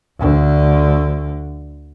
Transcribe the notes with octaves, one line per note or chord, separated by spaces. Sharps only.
D2 D3